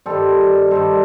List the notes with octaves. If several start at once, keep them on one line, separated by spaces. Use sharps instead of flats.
G2 D#3 G3 A4 C5
G2 D#3 G3 A4 C5